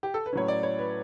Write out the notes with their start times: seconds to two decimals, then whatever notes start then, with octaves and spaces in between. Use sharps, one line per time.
0.03 G4
0.14 A4
0.26 B4
0.33 A2 F#3 C#4 C#5
0.48 D5
0.63 C#5
0.79 B4